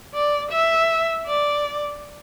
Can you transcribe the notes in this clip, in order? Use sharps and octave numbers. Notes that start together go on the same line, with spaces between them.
D5
E5
D5